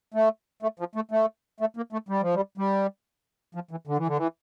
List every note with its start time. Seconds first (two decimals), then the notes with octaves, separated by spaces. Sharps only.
0.14 A3
0.62 A3
0.79 F3
0.95 A3
1.11 A3
1.60 A3
1.77 A#3
1.92 A3
2.09 G3
2.22 F3
2.34 G3
2.58 G3
3.55 F3
3.71 E3
3.87 D3
3.97 E3
4.07 D3
4.17 E3